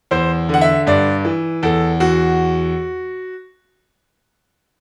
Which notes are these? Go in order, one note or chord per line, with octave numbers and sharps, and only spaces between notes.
E2 C5
D3 F#5
E5
G2 D5
E3
E2 A4
E2 F#4